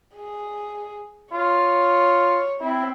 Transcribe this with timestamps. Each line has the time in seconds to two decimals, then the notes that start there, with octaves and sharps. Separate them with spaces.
0.16 G#4
1.32 F4 C#5
2.61 C4 E4